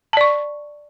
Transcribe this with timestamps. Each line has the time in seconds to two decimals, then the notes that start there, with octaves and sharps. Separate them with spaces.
0.13 A5
0.17 D5
0.21 C#6